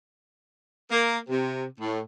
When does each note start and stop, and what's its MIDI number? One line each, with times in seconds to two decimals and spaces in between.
0.91 1.19 58
1.29 1.64 48
1.80 2.00 45